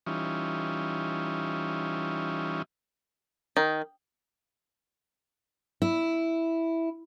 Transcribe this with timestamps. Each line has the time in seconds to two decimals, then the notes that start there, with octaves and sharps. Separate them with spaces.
0.06 E3 G3 C#4 D#4 F4
3.57 D#3
5.82 E4